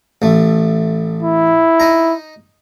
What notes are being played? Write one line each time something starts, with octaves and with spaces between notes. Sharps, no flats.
A1 A3
E4
D#4 A#5